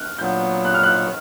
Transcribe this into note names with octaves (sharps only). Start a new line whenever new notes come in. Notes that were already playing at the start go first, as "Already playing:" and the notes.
Already playing: F6 F#6
A#2 F#3 B3 G6
F#6
F6
F#6